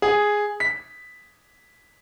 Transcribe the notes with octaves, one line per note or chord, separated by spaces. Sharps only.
G#4
B6